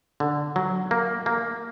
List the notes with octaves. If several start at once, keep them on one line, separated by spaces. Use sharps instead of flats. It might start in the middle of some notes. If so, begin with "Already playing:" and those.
D3
F#3
A#3
A#3